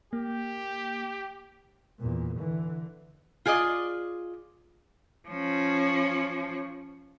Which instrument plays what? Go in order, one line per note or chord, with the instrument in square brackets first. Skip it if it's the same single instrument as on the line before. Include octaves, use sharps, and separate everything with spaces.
[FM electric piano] A#3 [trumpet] G4
[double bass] E2 A#2
D3 E3
[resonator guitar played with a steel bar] F4 G#4 D5 D#5
[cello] F3 C#4